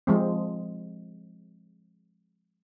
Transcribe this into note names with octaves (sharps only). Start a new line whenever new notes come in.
F3 G#3 C4